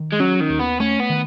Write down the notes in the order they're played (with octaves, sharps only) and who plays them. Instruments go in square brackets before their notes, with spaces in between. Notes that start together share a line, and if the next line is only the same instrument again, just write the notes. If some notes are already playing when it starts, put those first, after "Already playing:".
Already playing: [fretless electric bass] D#3
[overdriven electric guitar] G#3
[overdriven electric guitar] F#3 [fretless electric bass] C#4
[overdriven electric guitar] D#3
[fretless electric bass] D#2
[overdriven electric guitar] B3
[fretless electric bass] A3 [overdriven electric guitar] C#4
[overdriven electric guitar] B3
[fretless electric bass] D#3